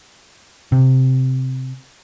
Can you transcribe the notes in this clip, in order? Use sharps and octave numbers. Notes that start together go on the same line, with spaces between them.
C3